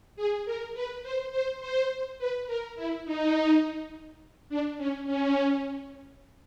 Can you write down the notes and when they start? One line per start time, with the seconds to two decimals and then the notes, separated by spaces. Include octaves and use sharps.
0.16 G#4
0.45 A#4
0.74 B4
1.03 C5
1.32 C5
1.61 C5
2.19 B4
2.47 A#4
2.76 E4
3.05 D#4
4.49 D4
4.78 C#4
5.07 C#4